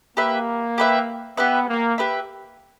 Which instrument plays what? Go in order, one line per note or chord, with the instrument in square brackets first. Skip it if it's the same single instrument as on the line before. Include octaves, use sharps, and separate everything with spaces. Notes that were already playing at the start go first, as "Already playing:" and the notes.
[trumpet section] A#3 [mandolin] G4 B4 E5
[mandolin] G4 B4 E5
[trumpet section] B3 [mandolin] G4 B4 E5
[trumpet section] A#3
[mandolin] G4 B4 E5